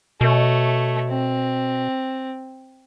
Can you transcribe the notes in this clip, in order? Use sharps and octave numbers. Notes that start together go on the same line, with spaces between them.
B2 A3 C#5
C4